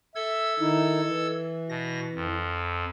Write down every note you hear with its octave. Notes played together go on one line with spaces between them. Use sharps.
A4 E5 E6 G#6
D#3 D#4 E4
E3
B2 A#6
F2